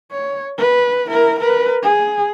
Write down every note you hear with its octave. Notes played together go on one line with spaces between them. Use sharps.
C#5
B4
E4 A#4
A#4 B4
G#4